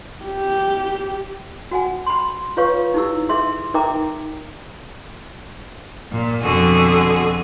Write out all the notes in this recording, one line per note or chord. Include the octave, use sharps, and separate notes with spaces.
G4
F#4 F#5 G#5
B5 C6
F4 B4 C#5 F5 C#6
D#4 E4 G4 E6
G#4 E5 C6
D#4 A#4 E5 G5 A#5 D6
A#2
F2 B2 D3 F#4 G#4